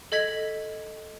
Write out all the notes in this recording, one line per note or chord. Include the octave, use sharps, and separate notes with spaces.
A4 D#5 G#6 B6 F#7